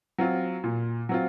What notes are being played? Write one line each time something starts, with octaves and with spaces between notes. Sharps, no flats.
F#3 C4 F4
A#2
F#3 C4 F4